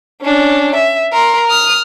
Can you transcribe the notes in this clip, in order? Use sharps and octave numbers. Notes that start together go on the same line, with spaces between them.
C#4 D4
E5
A#4 C6
D#6 F6